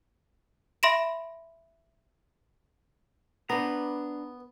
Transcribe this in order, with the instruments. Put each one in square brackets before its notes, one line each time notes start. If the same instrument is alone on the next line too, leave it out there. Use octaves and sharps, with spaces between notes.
[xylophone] E5 B5 C6 A#6 D7 E7
[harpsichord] B3 [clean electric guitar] D4 A#5 [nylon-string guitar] B4